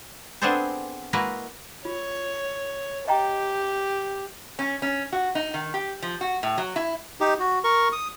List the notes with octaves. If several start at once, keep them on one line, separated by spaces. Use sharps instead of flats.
B3 C4 D4 G#4 A4 C5
G#3 A#3 E4 F#4 B4 D#5
F4 C#5
G4 D#5 G5 A#5
C#4
C#4
F#4
D#4
D#3
G4
F3
F#4
A2
F#3
E4
D#4 G4
F#4
A#4 C#6
D#6